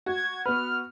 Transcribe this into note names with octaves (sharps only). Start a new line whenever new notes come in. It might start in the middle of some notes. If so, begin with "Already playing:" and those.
F#4 G#6
B3 B4 F6